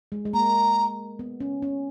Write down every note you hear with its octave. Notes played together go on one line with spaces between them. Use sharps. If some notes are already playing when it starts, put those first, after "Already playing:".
G#3
G#3
A#3 A#5
B3
C#4
C#4